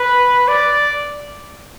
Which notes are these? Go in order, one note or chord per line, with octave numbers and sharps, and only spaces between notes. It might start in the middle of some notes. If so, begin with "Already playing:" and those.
Already playing: B4
D5